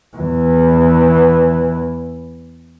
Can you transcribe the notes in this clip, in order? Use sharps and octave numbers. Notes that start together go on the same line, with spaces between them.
E2 E3